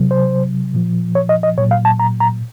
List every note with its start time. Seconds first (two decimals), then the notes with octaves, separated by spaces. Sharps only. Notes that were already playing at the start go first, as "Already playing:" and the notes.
Already playing: C3 F#3
0.11 C5
0.74 A#2 F3
1.15 C#5
1.29 D#5
1.43 D#5
1.58 A#2 F#3 C#5
1.71 F5
1.85 A5
2.00 A#5
2.20 A#5